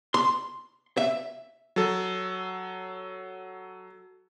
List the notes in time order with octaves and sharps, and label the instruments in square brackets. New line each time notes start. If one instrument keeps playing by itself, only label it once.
[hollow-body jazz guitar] C6
E5
[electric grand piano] F#3 A4